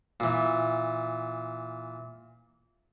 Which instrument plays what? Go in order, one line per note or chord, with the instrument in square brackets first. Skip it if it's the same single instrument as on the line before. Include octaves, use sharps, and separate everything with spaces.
[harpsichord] A#2 E3